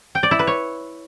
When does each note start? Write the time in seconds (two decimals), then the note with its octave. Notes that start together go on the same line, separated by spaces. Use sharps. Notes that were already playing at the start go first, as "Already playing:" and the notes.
0.15 G5
0.23 D5
0.31 E4
0.39 B4
0.47 C#5